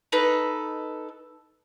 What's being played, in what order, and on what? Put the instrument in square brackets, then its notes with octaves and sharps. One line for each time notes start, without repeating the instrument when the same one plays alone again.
[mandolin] D#4 A4 B4